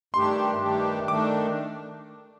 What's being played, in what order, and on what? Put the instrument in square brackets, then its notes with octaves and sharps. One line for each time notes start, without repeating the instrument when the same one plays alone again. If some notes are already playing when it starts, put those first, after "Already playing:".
[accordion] G2 D#3 A3 D4 G4 [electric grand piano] C6
[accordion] G2 D#3 A3 D4 G4
[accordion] D#3 A3 D4 [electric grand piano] D6